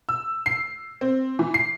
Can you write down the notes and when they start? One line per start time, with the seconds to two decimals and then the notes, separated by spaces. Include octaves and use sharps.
0.09 E6
0.46 C7
1.01 C4
1.39 E3
1.54 C7